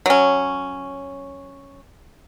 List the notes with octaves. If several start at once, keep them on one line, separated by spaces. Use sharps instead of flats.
F#3 C#4